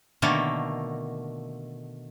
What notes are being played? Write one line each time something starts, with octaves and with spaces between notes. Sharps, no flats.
B2 D3 D#3 A3 A#3